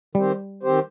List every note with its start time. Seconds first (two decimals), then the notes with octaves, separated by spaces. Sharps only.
0.15 D#3 G3 C4 G4 C5
0.63 D#3 C4 G4 C5